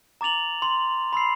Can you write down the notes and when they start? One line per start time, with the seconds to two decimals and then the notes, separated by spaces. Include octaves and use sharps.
0.21 A#5 D6 A6 F7 F#7
0.62 C6
1.13 B5 C6 E6 C7